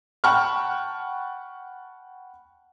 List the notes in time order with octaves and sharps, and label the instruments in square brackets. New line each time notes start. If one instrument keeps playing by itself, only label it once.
[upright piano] F#5 G5 A5 B5 C#6 F6